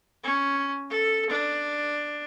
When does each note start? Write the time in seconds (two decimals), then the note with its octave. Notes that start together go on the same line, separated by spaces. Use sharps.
0.24 C#4
0.90 A4
1.30 D4